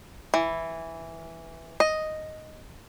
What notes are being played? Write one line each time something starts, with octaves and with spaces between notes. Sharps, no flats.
E3
D#5